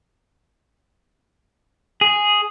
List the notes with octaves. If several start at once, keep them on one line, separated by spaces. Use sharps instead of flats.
G#4